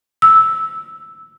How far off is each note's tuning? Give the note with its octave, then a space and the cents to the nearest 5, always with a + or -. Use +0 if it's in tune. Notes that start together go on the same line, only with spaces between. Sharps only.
E6 -10